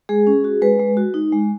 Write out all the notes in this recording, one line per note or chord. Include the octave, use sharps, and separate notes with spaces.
G#3 G#4
C#4
F#4
G#3 B4
G#3
F#4
D#4
G#3